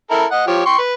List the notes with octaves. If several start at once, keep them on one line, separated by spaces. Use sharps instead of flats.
E4 A4 A#4
D#5 F#5
F3 G4 C#5
G5 C6 C#6
B4